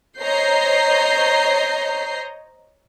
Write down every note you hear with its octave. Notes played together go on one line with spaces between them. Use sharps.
C5 C#5 D#5 A#5 G6 C7